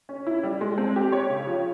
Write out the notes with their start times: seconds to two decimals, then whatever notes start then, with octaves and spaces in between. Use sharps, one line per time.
0.09 C#4
0.27 E4
0.43 G3
0.61 G#3
0.78 C4
0.96 G4
1.12 C#5
1.30 C#3
1.47 F3